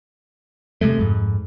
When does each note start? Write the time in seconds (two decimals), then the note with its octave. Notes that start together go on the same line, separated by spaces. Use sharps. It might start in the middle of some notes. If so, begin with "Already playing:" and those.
0.81 C3 D#3 G#3 A3
0.99 F2 G#2